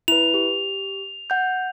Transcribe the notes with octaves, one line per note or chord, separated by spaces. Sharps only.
E4 B4 F7
G4
F#5 G6